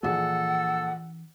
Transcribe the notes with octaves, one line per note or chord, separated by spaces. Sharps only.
A#1 E3 D4 G#4 A4 F#5